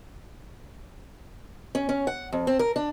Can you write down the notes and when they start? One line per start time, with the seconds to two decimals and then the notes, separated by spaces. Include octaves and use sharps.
1.75 C#4
1.89 C#4
2.07 F#5
2.33 F2
2.47 C4
2.59 A#4
2.76 D4